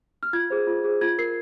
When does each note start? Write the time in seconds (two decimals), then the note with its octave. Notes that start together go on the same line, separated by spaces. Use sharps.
0.23 F6
0.33 F4 G#6
0.50 G#4 C5
0.67 F4
0.84 G#4 C5
1.01 F4 G#6
1.18 A#4 C7